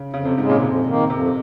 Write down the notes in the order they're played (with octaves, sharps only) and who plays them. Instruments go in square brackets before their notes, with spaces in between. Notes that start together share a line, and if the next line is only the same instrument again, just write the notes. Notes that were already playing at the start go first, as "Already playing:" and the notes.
Already playing: [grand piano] C#3
[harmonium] F2 [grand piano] C#3
[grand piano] C3
[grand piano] G#2 [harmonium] C#3
[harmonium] G#3
[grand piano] A#2
[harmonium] F2 [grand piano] C3
[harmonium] D#3 A#3
[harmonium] F2 [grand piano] C3